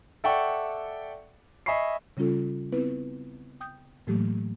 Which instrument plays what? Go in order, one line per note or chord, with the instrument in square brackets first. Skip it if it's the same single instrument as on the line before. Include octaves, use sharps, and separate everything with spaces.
[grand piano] A4 D5 E5 F#5 G5 C#6
D#5 E5 G#5 B5 C#6 C7
[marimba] C#3 G3 C#4 F4 A4
B3 C4 E4 B4
G5 D#6 G6
A2 E3 F#3 A3 A#3 G4